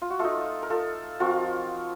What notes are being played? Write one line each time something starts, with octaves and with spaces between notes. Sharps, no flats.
F4
F#4
A3 D#4 F4 A4
A#4
F4 A4
F3 C4 F4 F#4 A#4